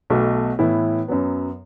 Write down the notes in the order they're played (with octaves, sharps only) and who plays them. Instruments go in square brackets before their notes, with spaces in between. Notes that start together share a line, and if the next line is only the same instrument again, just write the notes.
[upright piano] B1 B2 A3 F#4
A2 E3 B3 E4
F#2 F#3 B3